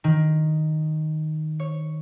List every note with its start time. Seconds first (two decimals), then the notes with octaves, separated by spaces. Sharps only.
0.04 D#3
1.60 C#5